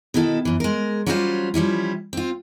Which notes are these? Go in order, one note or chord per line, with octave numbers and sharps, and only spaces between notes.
B2 D#3 E4 F#4 A4
F#2 E3
G#3 A#4
F#3 G3 C#4 F4 G4 C5
F3 G3 C#4 E4
C4 F4